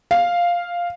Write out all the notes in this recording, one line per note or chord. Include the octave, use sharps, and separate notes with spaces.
F5